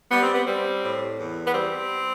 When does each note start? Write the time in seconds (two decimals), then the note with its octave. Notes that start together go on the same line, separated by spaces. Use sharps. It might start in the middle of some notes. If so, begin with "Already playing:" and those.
0.11 G3 B3
0.23 C4
0.34 B3
0.47 G3 C4
0.84 A2
1.19 E2
1.46 B3
1.54 G3 C4